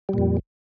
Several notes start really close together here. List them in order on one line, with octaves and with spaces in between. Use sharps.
G3 A#2 F2